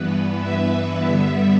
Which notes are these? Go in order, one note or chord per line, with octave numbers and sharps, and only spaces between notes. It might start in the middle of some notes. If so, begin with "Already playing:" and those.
Already playing: G2 E3 B3 B4
E5
G2 D3 G3 B3